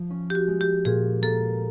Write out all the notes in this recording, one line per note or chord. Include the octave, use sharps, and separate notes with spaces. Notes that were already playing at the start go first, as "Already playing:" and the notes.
Already playing: F3
C#4
G4
F#4
G#3
G4
A#2 G#4
A#3 A4